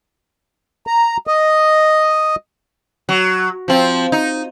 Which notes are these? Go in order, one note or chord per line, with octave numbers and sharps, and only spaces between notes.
A#5
D#5
F#3
F3 C4
D#4